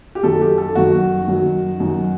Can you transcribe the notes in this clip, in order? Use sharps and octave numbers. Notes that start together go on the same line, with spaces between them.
G4
F#2 D#3 F#3 A4
G4
A4
F#2 D#3 F#3 F#4
F#2 D#3 F#3
F#2 D#3 F#3